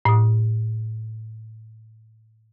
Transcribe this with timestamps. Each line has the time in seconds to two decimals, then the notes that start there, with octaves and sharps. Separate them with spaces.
0.05 A2 D#6